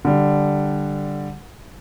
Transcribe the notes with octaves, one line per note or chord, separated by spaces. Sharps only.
D3 G3